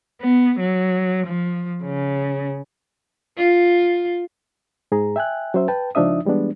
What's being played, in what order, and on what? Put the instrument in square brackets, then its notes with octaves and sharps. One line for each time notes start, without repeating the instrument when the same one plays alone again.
[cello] B3
F#3
F3
C#3
[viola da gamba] F4
[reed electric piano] G#2 G#4 A#5
E5 G5 G#5 F#6
F#3 C#4 C5 E5
B4 G5 A5
C#2 F3 D4 D#4 E5 D#6
E3 G3 G#3 B3 D4